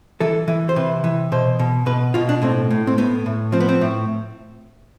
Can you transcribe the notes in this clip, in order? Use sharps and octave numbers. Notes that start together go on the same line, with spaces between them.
E3 A4
E3
C5
C3 B4
E3
B2 C5
B2
B2 B4
B2 F4
D4
A2 C4
A2
C4
A2 B3
A2
F3 C4
B3
C4
A2